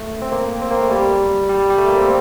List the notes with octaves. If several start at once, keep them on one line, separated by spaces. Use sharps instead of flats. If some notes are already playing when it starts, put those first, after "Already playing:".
Already playing: A3
C4
A#3
C4
A#3
A3
G3
G3
G3
A3
A#3
C4